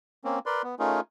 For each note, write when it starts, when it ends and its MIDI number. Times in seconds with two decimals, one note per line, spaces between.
0.24 0.39 58
0.24 0.39 60
0.24 0.39 61
0.46 0.62 70
0.46 0.62 71
0.46 0.62 74
0.46 0.62 84
0.64 0.75 59
0.79 1.01 57
0.79 1.01 61
0.79 1.01 63
0.79 1.01 65
0.79 1.01 68
0.79 1.01 70